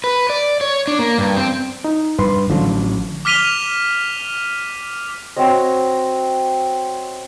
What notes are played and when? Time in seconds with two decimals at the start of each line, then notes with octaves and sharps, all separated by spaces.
0.04 B4
0.30 D5
0.61 C#5
0.87 D4
0.99 A#3
1.18 G2
1.37 C4
1.84 D#4
2.19 G2 B4 C6
2.50 A1 D3 F3 F#3
3.25 D6 F6 B6 D#7 F7 G7
5.36 C4 F#4 C#5 D#5